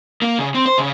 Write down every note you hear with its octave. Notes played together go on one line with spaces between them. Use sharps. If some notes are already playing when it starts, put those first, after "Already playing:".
A#3
C#3
C4
C5
C#3